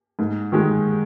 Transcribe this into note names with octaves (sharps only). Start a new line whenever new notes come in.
G#2
D#3 G#3